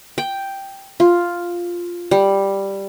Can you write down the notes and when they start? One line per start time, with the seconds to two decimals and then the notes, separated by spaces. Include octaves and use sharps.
0.18 G5
1.00 F4
2.11 G3